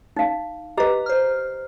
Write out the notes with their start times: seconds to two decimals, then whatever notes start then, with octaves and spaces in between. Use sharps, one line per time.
0.17 D#4 F5
0.77 G4 B4 D#5 A#5 D6
1.06 C5 F6